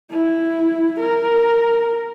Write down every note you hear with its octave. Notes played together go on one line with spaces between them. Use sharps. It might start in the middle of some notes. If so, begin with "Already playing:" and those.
E4
A#4